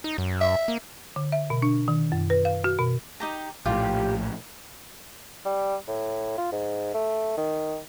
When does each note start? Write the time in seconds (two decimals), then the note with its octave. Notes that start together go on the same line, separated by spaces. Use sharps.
0.04 D#4
0.18 F#2
0.41 E5
0.68 A#3
1.16 D3
1.32 E5
1.50 B2
1.62 D4
1.88 D#3
2.12 F#2
2.30 B4
2.45 F5
2.64 F#4
2.79 B2
3.20 D#4 G4 A#5
3.66 A#1 A2 F4 G4
5.45 G3
5.88 A2
6.38 F4
6.52 G#2
6.94 A3
7.38 D#3